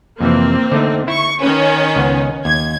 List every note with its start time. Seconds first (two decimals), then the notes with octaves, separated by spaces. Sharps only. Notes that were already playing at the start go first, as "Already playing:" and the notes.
0.21 F2 C3 E3 A#3 C4
0.72 D3 A3 D#4
1.08 E4 C#6
1.42 D#3 C#4 B4
1.96 C#2 B3
2.45 D#2 G#6